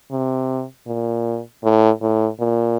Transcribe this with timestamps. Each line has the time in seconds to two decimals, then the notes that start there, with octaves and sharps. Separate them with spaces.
0.11 C3
0.87 A#2
1.64 A2
2.02 A2
2.40 A#2